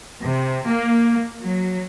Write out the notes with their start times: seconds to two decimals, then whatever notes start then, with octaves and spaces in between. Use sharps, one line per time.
0.21 C3
0.66 A#3
1.43 F#3